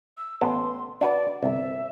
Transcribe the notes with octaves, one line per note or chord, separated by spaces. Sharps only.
E6
A1 B3 A5 C6
D4 F#4 B4 D5
G1 C2 E5